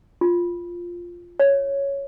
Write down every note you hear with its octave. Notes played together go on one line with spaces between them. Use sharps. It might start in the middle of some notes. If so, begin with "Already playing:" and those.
F4
C#5